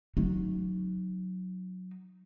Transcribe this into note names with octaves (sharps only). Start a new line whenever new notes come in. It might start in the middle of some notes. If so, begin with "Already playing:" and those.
F#3 D#4